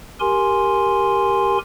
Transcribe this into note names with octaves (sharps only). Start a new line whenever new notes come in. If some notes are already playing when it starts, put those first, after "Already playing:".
G4 A#4 G#5 C6